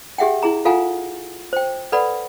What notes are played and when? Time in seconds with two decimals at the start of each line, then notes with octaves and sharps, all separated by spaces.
0.18 G4 G#4 E5 F#5 G5
0.43 E4 G#4 A#5
0.65 F4 A4 F5 F#5 G#5 A#5
1.53 C5 G5
1.92 A4 B4 D5 F#5 B5